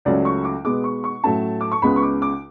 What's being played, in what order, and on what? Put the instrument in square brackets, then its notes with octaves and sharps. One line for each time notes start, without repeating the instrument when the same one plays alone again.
[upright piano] C#2 C#3 F#3 A3 C#4 D5
C#6
D6
B2 G#3 B3 D6
C#6
C#6
A2 F#3 A3 C#4 A5
D6
C#6
C#2 C#3 G#3 B3 B5
C#6
D6
D6